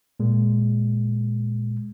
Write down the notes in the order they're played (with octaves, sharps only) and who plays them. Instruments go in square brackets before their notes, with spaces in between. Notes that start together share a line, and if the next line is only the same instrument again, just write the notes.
[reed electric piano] A#2 G#3